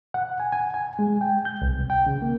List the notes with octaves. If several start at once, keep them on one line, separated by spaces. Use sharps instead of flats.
F#5
G#5
G#5
G#5
G#3
G5
G6
C2
G5
C#3
A#3